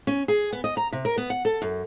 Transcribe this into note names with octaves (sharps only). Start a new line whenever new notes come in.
C#4
G#4
B3
D#5
A#5
C3
A#4
B3
F#5
A4
F#2